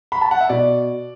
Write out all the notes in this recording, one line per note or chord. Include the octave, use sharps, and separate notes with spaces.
B5
A5
F#5
E5
B2 D5